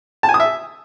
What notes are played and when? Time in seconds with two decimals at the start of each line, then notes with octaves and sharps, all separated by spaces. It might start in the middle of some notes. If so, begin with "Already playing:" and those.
0.23 A5
0.29 G#5
0.34 D#6
0.40 E5